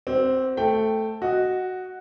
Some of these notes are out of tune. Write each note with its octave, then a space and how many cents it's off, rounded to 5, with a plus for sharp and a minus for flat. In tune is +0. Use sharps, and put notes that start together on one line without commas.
C4 +0 F#4 +40
A3 +0 G5 +0
F#4 +0 D#5 +0